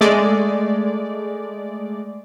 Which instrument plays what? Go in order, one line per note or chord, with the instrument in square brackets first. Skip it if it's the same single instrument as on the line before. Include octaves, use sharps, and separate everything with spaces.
[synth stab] G#3 A3 D5